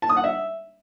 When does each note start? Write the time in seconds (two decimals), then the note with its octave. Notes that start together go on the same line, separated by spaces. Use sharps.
0.02 A5
0.09 D#6
0.17 F#5
0.24 E5